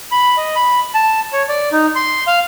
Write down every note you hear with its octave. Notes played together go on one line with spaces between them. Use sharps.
B5
D#5
B5
A5
C#5
D5
D#4
C6
F5